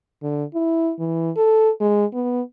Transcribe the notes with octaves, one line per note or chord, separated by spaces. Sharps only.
D3
E4
E3
A4
G#3
B3